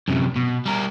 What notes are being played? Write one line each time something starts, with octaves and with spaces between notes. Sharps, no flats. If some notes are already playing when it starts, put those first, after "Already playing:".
F#2 C3
B2
G3 A#4